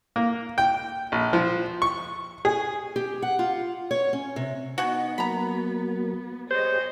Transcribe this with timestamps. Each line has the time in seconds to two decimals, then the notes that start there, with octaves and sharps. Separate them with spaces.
0.16 A#3
0.58 G5
1.12 A#1
1.33 F3
1.82 C#6
2.45 G#4
2.96 G4
3.22 F#5
3.39 F4
3.91 C#5
4.13 C#4
4.36 C3
4.78 B3 D#4 F#4 F#5 G#5
5.18 F#3 A#3 A#5 B5
6.51 G4 G#4 C5 C#5 D#5